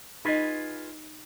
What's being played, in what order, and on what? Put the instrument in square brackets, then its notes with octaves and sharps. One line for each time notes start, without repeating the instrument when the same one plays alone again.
[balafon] D#4 D#5 [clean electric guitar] F4 G#4 B4